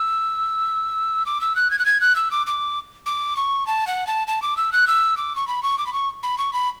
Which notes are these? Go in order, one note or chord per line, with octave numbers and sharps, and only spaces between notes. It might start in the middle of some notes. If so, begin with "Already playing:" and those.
Already playing: E6
D6
E6
F#6
G#6
F#6
G#6
F#6
E6
D6
D6
D6
C#6
A5
F#5
A5
A5
D6
E6
F#6
E6
D6
C#6
B5
C#6
D6
B5
C#6
B5
C#6
B5